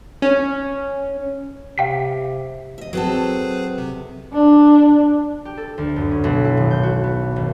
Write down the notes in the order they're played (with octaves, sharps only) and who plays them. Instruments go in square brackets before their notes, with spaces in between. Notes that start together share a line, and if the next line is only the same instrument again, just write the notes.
[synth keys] C#4
[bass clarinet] C3 [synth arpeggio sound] F5 G5 B6
[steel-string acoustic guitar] D#5 E5
[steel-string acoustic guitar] F#3 C4 A4 [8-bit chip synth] G#4 B4 C5
[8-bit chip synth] C3
[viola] D4
[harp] G4
A4
D2
F#2
C#4
B1
E4
D#1
G6
F#4
B3
G#1